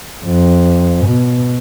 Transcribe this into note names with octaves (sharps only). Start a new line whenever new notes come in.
F2
B2